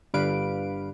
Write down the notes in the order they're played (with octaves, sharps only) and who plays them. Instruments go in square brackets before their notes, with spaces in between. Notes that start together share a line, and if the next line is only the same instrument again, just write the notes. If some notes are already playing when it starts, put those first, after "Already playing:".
[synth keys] G1 D3 G3 B4 F5 D7